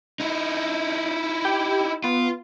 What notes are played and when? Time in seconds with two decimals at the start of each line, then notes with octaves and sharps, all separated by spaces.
0.20 D#4 E4
1.45 G4 G5
2.04 B3 F4